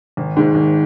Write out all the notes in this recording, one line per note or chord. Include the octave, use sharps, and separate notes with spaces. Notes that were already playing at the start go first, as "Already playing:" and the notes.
G#1
G#2 D#3 G#3
G#1